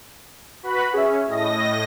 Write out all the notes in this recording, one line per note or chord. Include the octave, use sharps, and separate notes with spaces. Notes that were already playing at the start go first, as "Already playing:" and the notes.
F#4 B4 B5
C#4 G#4 E5
A2 D#5 A#6